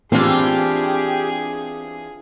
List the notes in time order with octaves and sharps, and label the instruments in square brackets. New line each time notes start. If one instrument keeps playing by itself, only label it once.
[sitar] E3 D4 F4 [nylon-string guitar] C4 [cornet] G4 [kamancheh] G#4